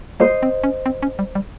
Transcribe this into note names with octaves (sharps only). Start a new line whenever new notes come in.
A#3 C5 D#5
C4
C#4
C4
C#4
G3
G3